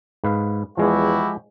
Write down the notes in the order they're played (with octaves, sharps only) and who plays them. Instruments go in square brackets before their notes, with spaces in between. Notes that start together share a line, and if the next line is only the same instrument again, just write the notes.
[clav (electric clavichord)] G#2 B4 F5
[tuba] E2 [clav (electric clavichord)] F3 G#3 [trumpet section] E4 F#4 G4